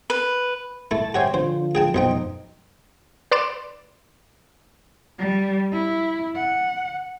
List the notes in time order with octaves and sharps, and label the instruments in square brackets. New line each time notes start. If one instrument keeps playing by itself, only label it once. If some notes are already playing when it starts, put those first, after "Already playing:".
[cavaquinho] B4
[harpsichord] A3 E4 [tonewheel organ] A5
[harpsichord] F#4 C#5 E5 [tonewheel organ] G4 C5 G#5
[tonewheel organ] D3 F3 [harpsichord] C5
[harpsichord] G#4 G5 A5
[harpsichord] B1 F3 G5 [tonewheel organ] F#2 D#4
[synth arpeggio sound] B4 D5 C6 D7 E7
[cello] G3
E4
F#5